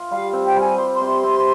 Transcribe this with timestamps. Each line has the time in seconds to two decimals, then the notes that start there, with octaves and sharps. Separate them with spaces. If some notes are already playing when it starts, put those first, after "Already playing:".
Already playing: F4
0.11 G3 F5
0.33 C4
0.45 G5
0.56 G3 G#5
0.78 G3 C6
0.95 C6
1.01 C3
1.24 C4